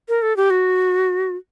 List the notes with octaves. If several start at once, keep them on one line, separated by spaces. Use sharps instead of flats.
A#4
A4
G4
F#4